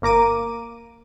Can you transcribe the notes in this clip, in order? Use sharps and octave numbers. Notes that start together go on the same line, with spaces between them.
G1 A#3 A#5 D6 D#7